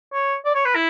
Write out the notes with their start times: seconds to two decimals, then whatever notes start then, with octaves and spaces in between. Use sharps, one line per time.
0.13 C#5
0.45 D5
0.54 C#5
0.65 B4
0.75 E4